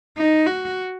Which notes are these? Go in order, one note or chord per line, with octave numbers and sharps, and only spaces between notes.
D#4
F#4